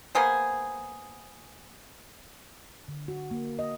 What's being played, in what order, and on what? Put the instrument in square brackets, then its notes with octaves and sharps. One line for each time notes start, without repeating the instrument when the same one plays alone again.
[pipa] A#3 B3 G#4 C5
[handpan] D3
F#4
A#3
D#5